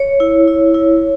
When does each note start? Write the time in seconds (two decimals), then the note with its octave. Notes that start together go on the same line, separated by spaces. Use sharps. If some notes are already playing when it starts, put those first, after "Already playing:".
Already playing: C#5
0.20 E4
0.48 E4
0.75 E4